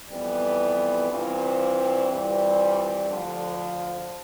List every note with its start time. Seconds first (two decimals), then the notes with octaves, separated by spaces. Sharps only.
0.10 F2 E3 G3 B3
1.09 G2 E3 G3 C4 F4
2.08 G2 E3 G3 C4 F4
3.07 D2 D3 F3